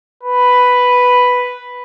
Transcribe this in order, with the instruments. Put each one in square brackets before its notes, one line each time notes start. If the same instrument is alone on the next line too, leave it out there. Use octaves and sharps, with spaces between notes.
[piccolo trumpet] B4